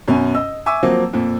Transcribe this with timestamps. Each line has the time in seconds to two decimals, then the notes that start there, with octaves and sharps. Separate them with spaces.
0.08 F#2 B2 C#4
0.35 D#5 E6
0.66 E5 G#5 C#6 D6 E6
0.83 F3 F#3 A#3 C4
1.13 F2 A#2